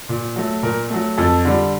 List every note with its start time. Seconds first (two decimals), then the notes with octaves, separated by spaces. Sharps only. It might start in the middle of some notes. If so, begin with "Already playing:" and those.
0.09 A#2
0.36 F#3 A3
0.63 A#2 A#4
0.90 F#3 A3
1.18 F2 A4
1.45 D3 G3